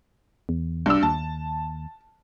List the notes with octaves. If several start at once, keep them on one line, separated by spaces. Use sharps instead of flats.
E2
C2 G2 D4 E6
D#2 A5